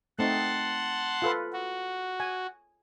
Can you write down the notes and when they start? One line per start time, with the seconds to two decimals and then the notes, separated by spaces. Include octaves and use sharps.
0.19 A3 C4 D#4 F#5 A5 C6
1.22 F4 A4 B4
1.53 F#4
2.20 G#5